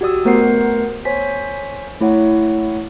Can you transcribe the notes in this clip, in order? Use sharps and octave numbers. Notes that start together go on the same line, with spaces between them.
F#4 G4 D5 D#6 E6
A3 B3 A#4 C5 F#5 C7
C5 C#5 G#5 B6
A3 E4 C#5 F#5